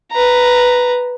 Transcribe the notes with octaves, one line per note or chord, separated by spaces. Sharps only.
B4 A#5